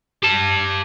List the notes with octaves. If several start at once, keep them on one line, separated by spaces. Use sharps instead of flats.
G4 A5